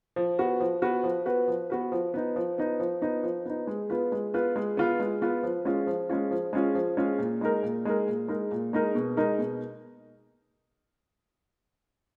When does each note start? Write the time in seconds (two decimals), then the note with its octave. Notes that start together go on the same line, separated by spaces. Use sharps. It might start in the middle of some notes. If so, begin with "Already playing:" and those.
0.16 F3
0.39 B3 F#4 B4
0.60 F3
0.82 B3 F#4 B4
1.03 F3
1.26 B3 F#4 B4
1.48 F3
1.70 B3 F#4 B4
1.92 F3
2.14 B3 D#4
2.36 F3
2.58 B3 D#4
2.80 F3
3.02 B3 D#4
3.23 F3
3.46 B3 D#4
3.67 G#3
3.90 B3 F4 B4
4.12 G#3
4.34 B3 F4 B4
4.56 G#3
4.77 B3 F4 B4
5.00 G#3
5.22 B3 F4 B4
5.43 F3
5.65 G#3 C#4 F4
5.87 F3
6.09 G#3 C#4 F4
6.31 F3
6.53 G#3 C#4 F4
6.75 F3
6.97 G#3 C#4 F4
7.18 A#2
7.41 G#3 D#4 A#4
7.63 A#2
7.85 G#3 D#4 A#4
8.07 A#2
8.28 G#3 D#4 A#4
8.51 A#2
8.73 G#3 D#4 A#4
8.95 B2
9.17 G#3 D#4 A#4
9.38 B2